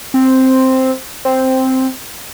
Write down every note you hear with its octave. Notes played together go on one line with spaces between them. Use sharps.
C4
C4